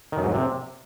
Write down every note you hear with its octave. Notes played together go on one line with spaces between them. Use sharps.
D#3
F#2
G#2
F#2
C3